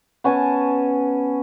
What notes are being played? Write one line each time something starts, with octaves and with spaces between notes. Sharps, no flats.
B3 C#4 G#5 A5